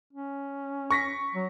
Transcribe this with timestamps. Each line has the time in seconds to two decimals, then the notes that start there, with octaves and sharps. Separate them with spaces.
0.13 C#4
0.91 C#6 A#6 B6
1.35 F#3